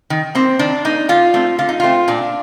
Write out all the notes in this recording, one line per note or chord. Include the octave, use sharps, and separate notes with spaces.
D#3
A#3 C4
D#3 D4
A#3 D#4
D3 F4
A3 C4
D3 F4
D#4
A3 C4 F4
A#2 D4